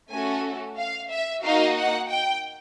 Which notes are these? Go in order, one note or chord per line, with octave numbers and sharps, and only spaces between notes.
A3 C#4 F#4 A4 G#5
F5
E5
A#3 D#4 F#4 F5
F#5
G5